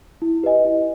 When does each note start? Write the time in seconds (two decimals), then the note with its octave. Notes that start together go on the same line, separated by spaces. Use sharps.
0.22 E4
0.43 G4 B4 D#5 G#5
0.65 E4